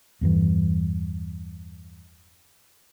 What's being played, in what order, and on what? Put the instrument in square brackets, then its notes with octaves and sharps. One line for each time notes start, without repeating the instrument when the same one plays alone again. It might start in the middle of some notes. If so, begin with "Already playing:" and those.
[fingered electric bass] E2 G2 E3